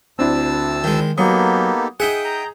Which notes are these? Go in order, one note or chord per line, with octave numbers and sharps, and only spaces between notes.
D2 C4 D4 E4 A5 E6
D#3 G#3
F#3 A#3 B3 D#4 G4 A4 D#6
D#4 G#4 E5 F#5 G5 D#6
A#5 G6